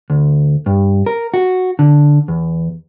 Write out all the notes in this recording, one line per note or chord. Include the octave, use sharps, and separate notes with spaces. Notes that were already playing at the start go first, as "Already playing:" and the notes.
D2
G2
A#4
F#4
D3
E2